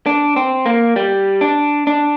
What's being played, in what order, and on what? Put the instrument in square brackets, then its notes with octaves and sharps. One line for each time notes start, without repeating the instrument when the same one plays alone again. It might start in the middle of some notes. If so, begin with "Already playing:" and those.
[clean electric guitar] D4
C4
A#3
G3
D4
D4